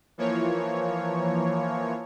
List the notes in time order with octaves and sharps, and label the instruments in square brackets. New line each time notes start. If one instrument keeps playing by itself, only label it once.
[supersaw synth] E3 F3 A#3 C#5